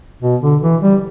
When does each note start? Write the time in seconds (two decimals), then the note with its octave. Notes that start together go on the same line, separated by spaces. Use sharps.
0.22 B2
0.42 D3
0.62 E3
0.82 G3